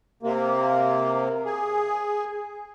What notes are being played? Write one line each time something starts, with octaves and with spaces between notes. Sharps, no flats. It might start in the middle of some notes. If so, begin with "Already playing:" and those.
C3 A#3
G#4